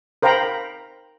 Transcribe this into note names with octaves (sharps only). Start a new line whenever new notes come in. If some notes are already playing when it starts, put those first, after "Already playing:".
A#4 C5 F5 G5 A#5 B5